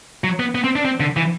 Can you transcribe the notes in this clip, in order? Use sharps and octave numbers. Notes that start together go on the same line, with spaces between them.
F#3
B3
B3
C4
D4
C4
D3
E3